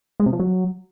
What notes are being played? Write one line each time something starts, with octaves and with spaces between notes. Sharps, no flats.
G#3
C3
F3
F#3